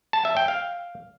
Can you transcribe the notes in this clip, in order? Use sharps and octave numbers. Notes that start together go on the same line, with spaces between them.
A5
E5
G5
F5